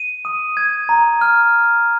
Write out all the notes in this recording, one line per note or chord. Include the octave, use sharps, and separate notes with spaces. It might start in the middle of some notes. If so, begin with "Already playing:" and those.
Already playing: D#7
D#6
G#6
A#5
F6